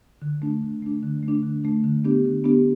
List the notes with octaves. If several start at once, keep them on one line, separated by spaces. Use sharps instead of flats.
D3
A3 D4
D3
A3 D4
D3
A3 D4
D3
A3 D4
D3
B3 D4 G4
D3
B3 D4 G4